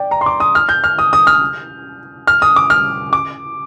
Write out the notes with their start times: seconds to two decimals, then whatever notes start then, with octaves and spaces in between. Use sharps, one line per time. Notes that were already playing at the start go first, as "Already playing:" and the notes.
Already playing: D5 G5
0.11 A#5
0.21 C6
0.26 D6
0.40 D#6
0.55 F6
0.69 G6
0.84 F6
0.99 D#6
1.13 D#6
1.27 F6
2.27 F6
2.42 D#6
2.56 D6
2.70 F6
3.13 D6